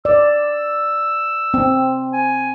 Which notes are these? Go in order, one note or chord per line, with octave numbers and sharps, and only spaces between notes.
D5 E6
C4
G#5